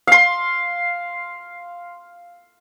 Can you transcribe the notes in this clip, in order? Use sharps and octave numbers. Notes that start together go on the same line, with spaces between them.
F5 C6